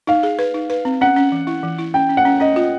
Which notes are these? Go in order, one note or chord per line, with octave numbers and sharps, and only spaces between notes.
D#4 F5
G#4
B4
D#4
B4
C4
C#4 F#5
C#4
E3
E4
E3
E4
C#4 G5
C#4
F#5
C#4
C#4 D#5
F4